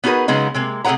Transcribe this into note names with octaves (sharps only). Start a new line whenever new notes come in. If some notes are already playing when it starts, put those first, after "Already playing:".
B3 D#4 F#4 G#4 A#4 B4
C#3 F#3 G#3 B3 D#4
C3 G#3 A#3
C3 A3 G#4 B4 F#5 A#5